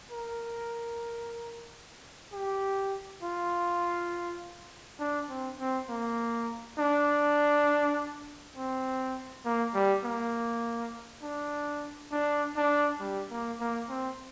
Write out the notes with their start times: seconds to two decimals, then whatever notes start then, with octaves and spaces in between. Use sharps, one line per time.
0.11 A#4
2.33 G4
3.23 F4
5.00 D4
5.29 C4
5.60 C4
5.89 A#3
6.79 D4
8.56 C4
9.45 A#3
9.74 G3
10.04 A#3
11.23 D4
12.12 D4
12.57 D4
13.00 G3
13.31 A#3
13.60 A#3
13.89 C4